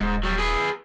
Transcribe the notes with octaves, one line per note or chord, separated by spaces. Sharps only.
D#1 G#2
F#3 G3
G#4 B4